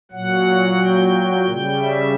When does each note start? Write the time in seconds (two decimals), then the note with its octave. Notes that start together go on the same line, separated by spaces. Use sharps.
0.12 A#2 F#3 F#5
0.79 G5
1.47 C#3 G3
1.79 E5